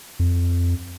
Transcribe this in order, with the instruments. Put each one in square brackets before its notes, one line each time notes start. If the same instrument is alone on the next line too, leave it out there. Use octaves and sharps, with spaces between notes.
[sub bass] F2